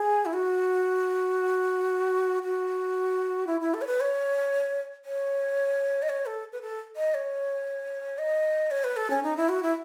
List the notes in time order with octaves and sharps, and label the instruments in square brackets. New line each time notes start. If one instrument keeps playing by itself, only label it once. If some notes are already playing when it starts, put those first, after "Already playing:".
Already playing: [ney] G#4
E4
F#4
F#4
E4
E4
A4
C#5
B4
C#5
C#5
D#5
C#5
A4
B4
A4
D#5
C#5
D#5
C#5
B4
A4
C#4
D#4
E4
F#4
E4